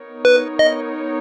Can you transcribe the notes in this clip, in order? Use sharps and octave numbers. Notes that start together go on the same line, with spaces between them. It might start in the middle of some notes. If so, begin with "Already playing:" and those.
Already playing: B3 D#4 A#4 C#5
B4
D#5